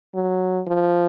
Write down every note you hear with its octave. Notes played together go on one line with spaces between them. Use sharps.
F#3
F3